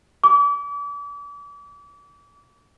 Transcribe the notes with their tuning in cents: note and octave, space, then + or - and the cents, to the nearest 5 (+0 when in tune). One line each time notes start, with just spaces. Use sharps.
D6 -35